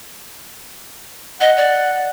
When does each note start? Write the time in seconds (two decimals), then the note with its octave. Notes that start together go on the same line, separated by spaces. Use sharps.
1.41 D#5 F#5
1.57 D5